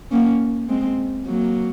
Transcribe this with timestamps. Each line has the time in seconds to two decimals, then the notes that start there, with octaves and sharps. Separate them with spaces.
0.11 A#3 C#4
0.69 G#3 C4
1.26 F#3 A#3